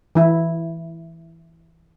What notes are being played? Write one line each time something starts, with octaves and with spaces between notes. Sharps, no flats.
E3 E4